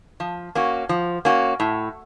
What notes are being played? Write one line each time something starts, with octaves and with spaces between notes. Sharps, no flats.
F3
A#3 C#4 F#4
F3
A#3 C#4 F#4
A2